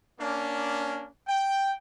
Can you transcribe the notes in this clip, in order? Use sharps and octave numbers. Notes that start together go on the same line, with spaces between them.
A#3 C#4 D4
G5